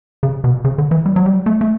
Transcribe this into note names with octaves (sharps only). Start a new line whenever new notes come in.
C#3
B2
C#3
D3
E3
G3
F#3
G3
A3
A3